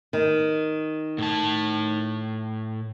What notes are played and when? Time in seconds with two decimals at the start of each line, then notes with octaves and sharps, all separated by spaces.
0.13 D#3
1.18 A2 A5